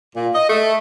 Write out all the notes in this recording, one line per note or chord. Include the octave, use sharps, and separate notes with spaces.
A#2
D#5
A3